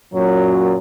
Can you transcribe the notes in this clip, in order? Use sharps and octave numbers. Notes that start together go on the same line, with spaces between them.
F#2 A#2 F#3